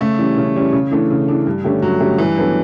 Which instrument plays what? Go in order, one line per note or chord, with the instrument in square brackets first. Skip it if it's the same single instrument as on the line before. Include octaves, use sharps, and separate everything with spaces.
[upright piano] C#3 [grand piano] A3
[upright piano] E3 G3 C#4
C#3
E3 G3 C#4
C#3
E3 A3 D4
C#3
E3 A3 D4
G2
D3 A3 C#4 G4
[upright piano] G2 [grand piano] F#3
[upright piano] D3 A3 C#4 G4
[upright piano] G2 [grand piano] E3
[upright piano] F#3 B3 D4 A4